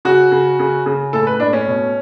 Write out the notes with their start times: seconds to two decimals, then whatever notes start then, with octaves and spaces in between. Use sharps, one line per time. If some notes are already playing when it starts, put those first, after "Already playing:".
0.05 C#3 F#4
0.32 C#3
0.59 C#3
0.86 C#3
1.13 A2 A4
1.27 B4
1.39 A2 D4
1.53 C#4
1.67 B2